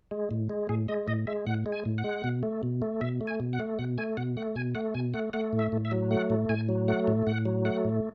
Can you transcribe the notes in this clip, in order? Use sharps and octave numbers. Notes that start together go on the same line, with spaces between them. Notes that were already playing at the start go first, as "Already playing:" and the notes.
G#3
A2
G#3
A2 G#4
G#3 D#5
A2 D#5
G#3 E5
A2 F#5
G#3
G#5
A2
F#5
G#3
B2
A3
B2
A3
B2 E5
A3
G#5
B2
F#5
A3
B2 F#5
A3 G#5
B2 F#5
A3 F#5
B2 G#5
A3 F#5
B2 G#5
A3 F#5
A3 F#5
A2
E5
A2
E5
F#3
A3 F#5
A2
A2 G#5
F#3
A3 F#5
A2
A2 F#5
F#3
A3 F#5
A2